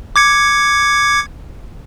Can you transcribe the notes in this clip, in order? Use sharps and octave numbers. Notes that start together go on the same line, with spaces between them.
D6 G#6 C#7